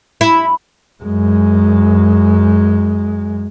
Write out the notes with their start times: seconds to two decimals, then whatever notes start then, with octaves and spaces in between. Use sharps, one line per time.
0.21 E4
1.03 F#2 G#3